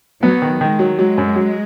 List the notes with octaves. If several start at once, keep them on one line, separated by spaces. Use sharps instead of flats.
F#3 B3
D#3
D#3 G#3
F#3
F#3 G#3
F#2
F#3